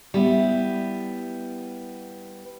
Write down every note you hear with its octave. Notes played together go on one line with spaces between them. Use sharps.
G3 B3 E4